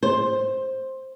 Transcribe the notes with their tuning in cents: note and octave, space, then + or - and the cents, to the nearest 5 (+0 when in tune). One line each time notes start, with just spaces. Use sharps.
C5 +10